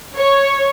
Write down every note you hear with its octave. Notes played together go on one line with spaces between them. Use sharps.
C#5